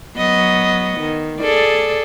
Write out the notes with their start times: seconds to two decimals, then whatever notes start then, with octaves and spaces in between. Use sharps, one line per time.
0.17 F#3 B3 D#5
1.00 D#3
1.40 G#4 A4 D5